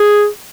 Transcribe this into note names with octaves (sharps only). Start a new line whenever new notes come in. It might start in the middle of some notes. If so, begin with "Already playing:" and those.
Already playing: G#4